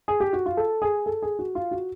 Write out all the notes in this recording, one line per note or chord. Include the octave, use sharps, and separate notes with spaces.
G#4
G4
F#4
F4
A4
G#4
A4
G#4
F#4
F4
F#4